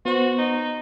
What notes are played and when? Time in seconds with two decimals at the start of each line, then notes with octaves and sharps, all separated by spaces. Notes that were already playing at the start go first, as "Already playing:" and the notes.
0.05 B3 F#4 C5
0.38 D#4